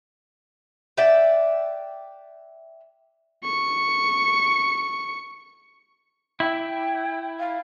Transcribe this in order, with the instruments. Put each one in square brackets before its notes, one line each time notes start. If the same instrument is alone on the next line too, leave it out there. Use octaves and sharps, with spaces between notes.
[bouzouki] D5 E5 F#5 G5
[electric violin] C#6 C#7
[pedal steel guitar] E4 [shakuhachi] G5
[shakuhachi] F5